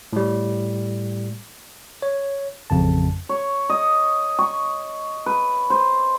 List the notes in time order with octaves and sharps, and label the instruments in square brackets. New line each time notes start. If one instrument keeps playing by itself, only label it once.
[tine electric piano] A2 G3
C#5
A1 F2 C#3 A5
[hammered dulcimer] C#5
D#5
C#6
B4
C5